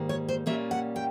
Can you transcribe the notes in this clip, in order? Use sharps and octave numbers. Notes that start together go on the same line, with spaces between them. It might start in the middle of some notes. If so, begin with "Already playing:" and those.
Already playing: G#2 D#3 G3 A#3
C#5
C5
A#2 G3 A#3 C#4 E5
F#5
G5